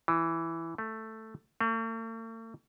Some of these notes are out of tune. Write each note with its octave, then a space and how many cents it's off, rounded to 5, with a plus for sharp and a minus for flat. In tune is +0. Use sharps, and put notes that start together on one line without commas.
E3 +5
A3 +5
A3 +45